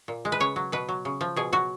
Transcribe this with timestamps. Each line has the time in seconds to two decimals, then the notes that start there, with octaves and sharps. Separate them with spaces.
0.08 A#2
0.25 G#3
0.32 B4
0.40 C#3 C#5
0.56 F#3
0.72 B2 B4
0.89 F#3
1.05 C#3
1.21 F3
1.36 B2 G#4
1.52 F#3 F#4